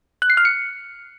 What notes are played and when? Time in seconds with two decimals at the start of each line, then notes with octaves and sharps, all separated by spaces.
0.22 F#6
0.30 C7
0.37 F6
0.45 C#7